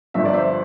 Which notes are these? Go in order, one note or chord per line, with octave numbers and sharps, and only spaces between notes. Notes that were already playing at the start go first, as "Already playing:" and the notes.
G1 G2 F3 E5
D5
C5 E5